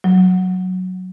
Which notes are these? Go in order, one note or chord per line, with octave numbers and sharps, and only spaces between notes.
F#3